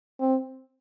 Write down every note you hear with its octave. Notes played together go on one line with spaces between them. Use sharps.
C4